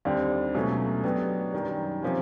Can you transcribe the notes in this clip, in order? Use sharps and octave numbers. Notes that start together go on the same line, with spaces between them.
D#2 D3 G3 C4
C#2 B2 F#3 A3 C#4
B2 F#3 B3 D4 G4
F#2 D#3 G3
C3 F3 A#3 C#4